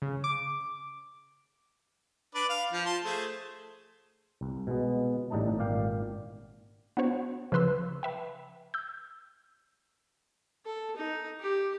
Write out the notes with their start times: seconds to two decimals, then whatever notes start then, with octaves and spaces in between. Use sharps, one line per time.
0.02 C#3
0.24 D6
2.35 D4 B4 D5
2.49 F5
2.72 F3
2.86 A5 C6
3.04 A3 G#4 C5
4.41 C2
4.67 B2 G#3 B3
5.30 A1 A2 G3 D#4 D#5 A5
5.58 G#1 A#2 D5 F5 G5
6.97 B3 D4 F#4 C5 C#5
7.52 C#3 F3 B4 C6 E6
8.03 B4 E5 G5
8.74 E6 G6
10.66 A4
10.97 D#4
11.40 G4